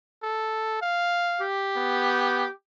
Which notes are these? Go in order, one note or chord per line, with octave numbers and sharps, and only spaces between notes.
A4
F5
G4
B3